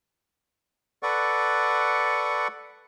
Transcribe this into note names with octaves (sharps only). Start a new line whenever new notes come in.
A4 B4 D5 F#5 C#6